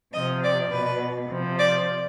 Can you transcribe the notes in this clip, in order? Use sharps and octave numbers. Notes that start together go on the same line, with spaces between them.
C3 F3 D#5
D5
B2 B4
C3 F3
D5